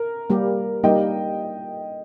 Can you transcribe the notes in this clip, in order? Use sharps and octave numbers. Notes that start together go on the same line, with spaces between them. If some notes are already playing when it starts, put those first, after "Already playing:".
Already playing: A#4
G3 A#3 G4
G3 A#3 D#4 G4 D#5 G5